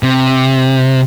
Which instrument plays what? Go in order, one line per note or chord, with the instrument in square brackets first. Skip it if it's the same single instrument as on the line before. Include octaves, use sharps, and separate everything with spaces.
[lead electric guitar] C3